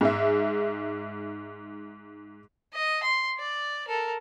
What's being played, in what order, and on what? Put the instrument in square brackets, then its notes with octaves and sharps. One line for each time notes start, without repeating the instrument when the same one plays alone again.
[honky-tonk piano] G#2 G#4 E5
[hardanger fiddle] D#5
C6
D5
A4 A#4